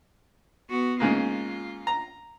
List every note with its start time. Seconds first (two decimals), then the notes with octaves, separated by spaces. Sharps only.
0.69 B3 F#4
1.00 G#2 C#3 A#3 F4
1.87 A#5